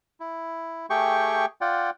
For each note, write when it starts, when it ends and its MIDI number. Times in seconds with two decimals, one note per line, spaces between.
0.20 0.86 64
0.90 1.46 57
0.90 1.46 67
0.90 1.46 68
0.90 1.46 79
0.90 1.46 85
1.61 1.90 65
1.61 1.90 74
1.61 1.90 78
1.61 1.90 79